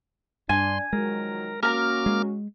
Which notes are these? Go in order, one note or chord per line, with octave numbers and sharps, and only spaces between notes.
G2 D4 G#5 C6
D#3 F3 F#3 G#3 A#4
A#3 C#4 F#4 A#4 A#5 D6 F6
G#3